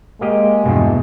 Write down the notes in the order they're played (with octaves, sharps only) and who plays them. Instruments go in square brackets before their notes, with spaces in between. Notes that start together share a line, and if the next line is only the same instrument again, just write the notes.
[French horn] G#3 [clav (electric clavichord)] A#3 G4 D#5
[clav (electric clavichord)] E2 G2 B2